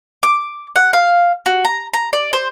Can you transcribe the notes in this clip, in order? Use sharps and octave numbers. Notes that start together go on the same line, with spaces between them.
D6
F#5
F5
F#4
A#5
A#5
D5
C5